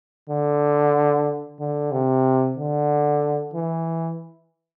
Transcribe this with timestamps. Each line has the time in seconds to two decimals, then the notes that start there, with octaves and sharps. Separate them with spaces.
0.30 D3
1.60 D3
1.92 C3
2.57 D3
3.54 E3